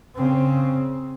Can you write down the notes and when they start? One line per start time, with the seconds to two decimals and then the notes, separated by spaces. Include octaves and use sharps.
0.16 C#3 C4